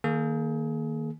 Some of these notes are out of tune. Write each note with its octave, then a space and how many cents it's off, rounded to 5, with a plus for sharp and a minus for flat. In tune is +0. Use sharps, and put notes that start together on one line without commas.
D#3 +0 A#3 -5 G#4 +30